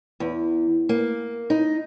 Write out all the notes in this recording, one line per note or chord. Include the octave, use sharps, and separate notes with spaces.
E2
A#3
D#4